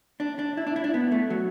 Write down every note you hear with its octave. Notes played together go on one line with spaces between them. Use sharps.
D4
D4
E4
D4
E4
D4
B3
A3
F#3